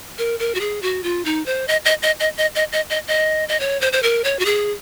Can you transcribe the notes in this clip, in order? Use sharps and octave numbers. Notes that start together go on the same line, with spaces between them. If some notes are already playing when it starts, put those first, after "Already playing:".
A#4
A#4
F#4
G#4
F#4
F4
D#4
C5
D#5
D#5
D#5
D#5
D#5
D#5
D#5
D#5
D#5
D#5
C#5
C5
C5
A#4
C#5
F#4
G#4